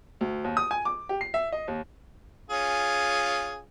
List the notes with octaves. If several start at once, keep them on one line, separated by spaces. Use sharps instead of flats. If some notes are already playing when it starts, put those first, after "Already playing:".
D2
D#2
D#6
G#5
D6
G4
C7
E5
D#5
D#2
C#4 F4 G#4